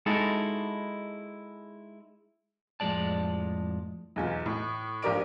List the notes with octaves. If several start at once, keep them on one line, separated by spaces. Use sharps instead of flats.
G#3 D#4 E4 F#4 A4
F2 A2 F3 G#3 D5 A5
B1 E2 F4
A2
A#1 F3 G4 A#4 D5 D7